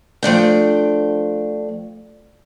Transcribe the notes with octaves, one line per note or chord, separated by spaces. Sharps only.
F3 A3 D4 G5